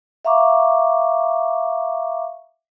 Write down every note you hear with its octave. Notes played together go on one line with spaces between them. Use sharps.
E5 F5 A#5 C#6 D6